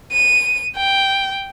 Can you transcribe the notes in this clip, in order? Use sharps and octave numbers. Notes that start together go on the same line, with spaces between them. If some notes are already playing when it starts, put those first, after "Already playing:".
D#7
G5